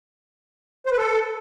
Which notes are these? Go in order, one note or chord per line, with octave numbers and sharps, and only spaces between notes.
C5
B4
A4